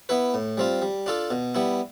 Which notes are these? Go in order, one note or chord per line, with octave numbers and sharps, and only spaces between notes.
B3 E4 B4
A2
G3 C4 F4
G3
D4 F4 A4
B2
G3 B3 E4